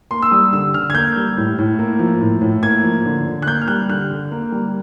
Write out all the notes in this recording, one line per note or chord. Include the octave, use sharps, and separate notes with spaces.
A#3 C6
E6
G3 D#6
D3 E6
D3 F6
G#6
A#3 G6
G3
A2
A2
A#3
F3
A2
A2
A#3 G#6
F3
D3
D3
F#6
A#3 G6
F6
G3 F#6
D3 F#6
D3
A#3
G3